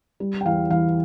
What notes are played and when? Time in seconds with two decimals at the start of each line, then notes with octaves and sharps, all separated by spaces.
0.20 G3
0.41 G5
0.46 E2 F5
0.70 E3 F5